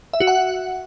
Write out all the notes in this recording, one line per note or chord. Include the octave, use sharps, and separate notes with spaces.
E5
F#4
F#5